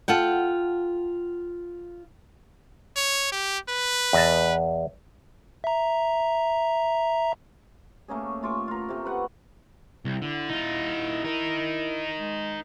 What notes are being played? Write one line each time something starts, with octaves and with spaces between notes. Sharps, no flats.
F4 A4 F#5 G5
C#5
G4
B4
E2 D#5 A5
E5 A#5
A3 A#3 C#4 G#4
A3 F4 C#6 D6
F4 A#4
C3 A3
B4 F#5 C#6
C2
D3 E4
D#4 F4
D#4 A#4
G#3